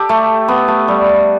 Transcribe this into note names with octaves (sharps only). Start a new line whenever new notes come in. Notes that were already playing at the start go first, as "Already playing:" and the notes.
Already playing: G4 A4
A3
B3
A3
G3